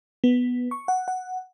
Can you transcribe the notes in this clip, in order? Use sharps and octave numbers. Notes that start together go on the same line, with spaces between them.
B3
C#6
F#5
F#5